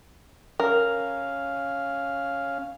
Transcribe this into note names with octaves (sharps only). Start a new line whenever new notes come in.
C#4 A#4 F5